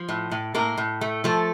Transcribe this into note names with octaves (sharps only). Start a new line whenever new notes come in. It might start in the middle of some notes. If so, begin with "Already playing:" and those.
Already playing: F3
A2
A2
A2 A#3 A#4
A2
A3
F3 A3 A4